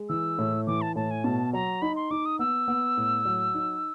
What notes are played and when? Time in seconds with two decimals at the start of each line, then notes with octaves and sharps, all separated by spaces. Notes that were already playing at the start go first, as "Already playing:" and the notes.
Already playing: G#3
0.09 E3 E6
0.38 A2
0.67 E3 D6
0.82 A5
0.96 A2 A5
1.11 G#5
1.24 B2 A5
1.53 F#3 A#5
1.82 D#4 B5
1.96 C6
2.11 D#4 D6
2.26 D#6
2.39 B3 E6
2.68 B3
2.97 A2
3.25 F#3
3.54 D#4